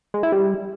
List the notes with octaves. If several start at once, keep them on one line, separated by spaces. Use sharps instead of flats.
G#3
E4
G3